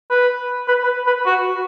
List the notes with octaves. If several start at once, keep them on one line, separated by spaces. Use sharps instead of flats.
B4
B4
B4
B4
F#4